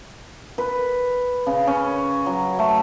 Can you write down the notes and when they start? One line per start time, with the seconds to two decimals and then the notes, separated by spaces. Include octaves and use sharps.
0.58 B4
1.47 C#3
1.67 C#4
2.26 F#3
2.59 A3